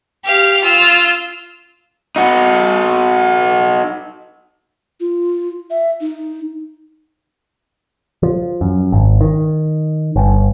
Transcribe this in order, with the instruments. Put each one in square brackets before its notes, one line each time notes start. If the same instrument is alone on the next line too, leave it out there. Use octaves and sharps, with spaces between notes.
[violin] G4 F5
F4 E6
[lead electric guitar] D#4 F#4
[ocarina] F4
E5
D#4
[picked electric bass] F3
F#2
G#1
D#3
G1